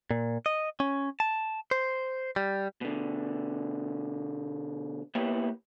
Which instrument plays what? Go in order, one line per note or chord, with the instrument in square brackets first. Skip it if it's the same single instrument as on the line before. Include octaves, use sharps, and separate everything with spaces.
[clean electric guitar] A#2
D#5
C#4
A5
C5
G3
B2 D3
A#3 B3 E4 G4 C#5